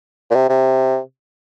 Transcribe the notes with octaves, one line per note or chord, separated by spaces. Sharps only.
A#2
C3
C3